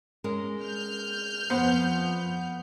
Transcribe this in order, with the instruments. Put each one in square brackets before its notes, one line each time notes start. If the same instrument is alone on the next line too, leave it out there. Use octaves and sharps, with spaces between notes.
[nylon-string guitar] G#3 C#4 A#4
[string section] F6 G6
[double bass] F2 F3 [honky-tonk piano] B3 [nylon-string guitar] C5 F#5